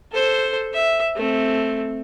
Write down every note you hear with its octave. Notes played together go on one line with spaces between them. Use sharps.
A4 C5
E5
A3 C4